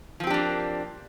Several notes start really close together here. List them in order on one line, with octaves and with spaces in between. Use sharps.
F3 C4 G4 D4 A#3